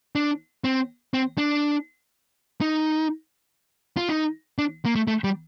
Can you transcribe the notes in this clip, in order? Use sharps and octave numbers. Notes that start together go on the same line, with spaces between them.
D4
C4
C4
D4
D#4
F4
D#4
D4
A#3
A3
A3
G3